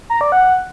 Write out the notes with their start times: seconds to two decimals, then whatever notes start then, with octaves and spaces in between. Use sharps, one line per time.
0.10 A#5
0.21 D5
0.32 F#5